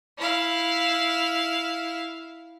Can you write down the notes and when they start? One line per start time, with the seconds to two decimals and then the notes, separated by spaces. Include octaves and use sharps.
0.18 E4 F5